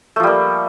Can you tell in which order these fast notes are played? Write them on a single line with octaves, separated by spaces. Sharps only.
A3 F3 G3 A#3